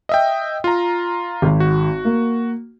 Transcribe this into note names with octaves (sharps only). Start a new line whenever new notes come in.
D#5 E5 G5
F4 A#5
G#1
F#4
A#3